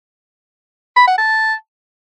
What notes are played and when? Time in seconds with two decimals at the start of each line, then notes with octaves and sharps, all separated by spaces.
0.96 B5
1.07 F#5
1.18 A5